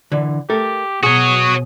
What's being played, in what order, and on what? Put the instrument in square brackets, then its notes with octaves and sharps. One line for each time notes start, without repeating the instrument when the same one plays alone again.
[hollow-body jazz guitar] D3 E3
[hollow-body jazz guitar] A3 A4 A#4 [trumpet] G4
[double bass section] B2 [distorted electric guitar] F#4 C#5 [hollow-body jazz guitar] G#4 [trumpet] D#6